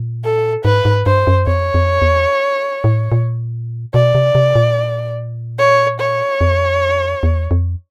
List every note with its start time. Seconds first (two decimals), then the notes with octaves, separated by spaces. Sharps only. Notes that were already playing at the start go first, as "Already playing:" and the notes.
Already playing: A#2
0.24 A4
0.65 G#2 B4
0.85 G#2
1.06 G2 C5
1.27 F#2
1.47 F2 C#5
1.74 F2
2.02 E2
2.84 A2
3.12 A#2
3.94 B2 D5
4.15 C3
4.35 C3
4.55 A#2
5.59 C#5
6.00 C#5
6.41 F2
7.23 E2
7.51 F2